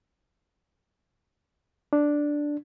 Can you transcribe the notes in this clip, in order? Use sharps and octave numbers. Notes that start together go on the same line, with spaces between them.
D4